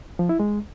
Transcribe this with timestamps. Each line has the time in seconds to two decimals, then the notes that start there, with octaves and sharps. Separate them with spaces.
0.19 F3
0.29 E4
0.40 G#3